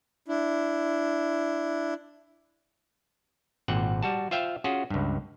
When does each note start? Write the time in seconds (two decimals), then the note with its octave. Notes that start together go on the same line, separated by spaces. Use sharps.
0.28 D4 E4
3.68 G#1 A#2 C4 F#5
4.03 G3 F#4 A5
4.31 F4 C5 E5 F5 G5
4.64 C#4 F4 F#4 G#4
4.90 C#2 G2